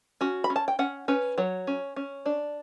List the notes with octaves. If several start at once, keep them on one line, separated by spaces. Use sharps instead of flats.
C#4 F#4
B5
C#4
A5
G5
C#4 F#5
C#4 B4
F#3 C#5
C#4
C#4
D4 D5